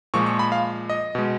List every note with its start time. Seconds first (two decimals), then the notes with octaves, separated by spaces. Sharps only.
0.14 A#2 F3 G#3 C#6
0.26 C#6
0.39 B5
0.52 F5
0.90 D#5
1.15 B2 G#3